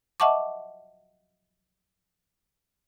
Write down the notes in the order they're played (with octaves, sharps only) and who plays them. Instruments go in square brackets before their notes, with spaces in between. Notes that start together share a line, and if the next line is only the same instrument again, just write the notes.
[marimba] D#5 E5 F#5 A5 C#6 D6